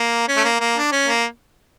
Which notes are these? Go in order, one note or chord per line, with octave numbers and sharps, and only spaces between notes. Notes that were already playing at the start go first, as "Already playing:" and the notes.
Already playing: A#3
C#4
A3
A#3
A#3
D4
C#4
A#3